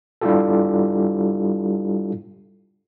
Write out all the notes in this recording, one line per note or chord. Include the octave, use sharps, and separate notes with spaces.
G3 D4 E4 F4 G4 A4